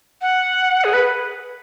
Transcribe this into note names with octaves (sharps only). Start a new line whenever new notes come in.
F#5
G#4
B4